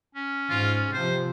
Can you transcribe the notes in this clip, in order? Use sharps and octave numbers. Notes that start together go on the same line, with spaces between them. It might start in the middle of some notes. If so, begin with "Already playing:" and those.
C#4
G#2 F4
C3 F3 C5